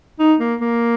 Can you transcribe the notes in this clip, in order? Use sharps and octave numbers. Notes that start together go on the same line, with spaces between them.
D#4
A#3
A#3